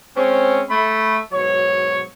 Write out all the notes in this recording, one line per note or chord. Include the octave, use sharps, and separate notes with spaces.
G#3 C4 C#4
A3 B5
G#2 B2 F#3 C#5